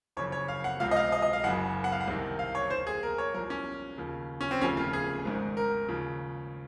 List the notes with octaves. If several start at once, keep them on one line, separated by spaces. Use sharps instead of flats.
F#1 F2 C#3 C#5
C#5
F5
F#5
C#2 C3 F3 F5
D#5
F5
D#5
D#5
F5
F#1 F#2 C#3 F#5
F#5
F5
F#5
C2 C3 D#3
F5
C#5
D#2 D#3 C5
G#4
A#4
C#5
C2 A#2 F3 A#4
C#4
D#2 C#3 F3
C#4
C4
F1 D#2 C#3 F3 C#4
F4
G#4
G#1 G#2 D#3
A#4
D#2 C#3 F3